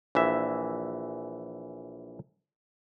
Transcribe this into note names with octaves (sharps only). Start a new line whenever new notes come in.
A#1 E3 E5